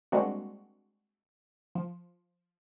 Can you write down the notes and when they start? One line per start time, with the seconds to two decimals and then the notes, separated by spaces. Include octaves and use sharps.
0.12 G3 G#3 A#3 C4 D4 F#4
1.75 F3